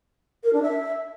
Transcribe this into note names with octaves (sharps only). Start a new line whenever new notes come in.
A#4
D4
E5